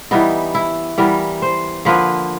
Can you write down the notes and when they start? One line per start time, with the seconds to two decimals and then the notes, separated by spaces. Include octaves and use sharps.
0.11 E3 G3 B3 D#4
0.55 E4
0.98 E3 G3 B3 A#4
1.42 C5
1.85 D3 F3 A#3 B4